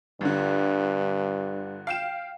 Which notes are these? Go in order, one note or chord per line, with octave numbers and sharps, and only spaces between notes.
G1 G2 D3
F5 G5 E7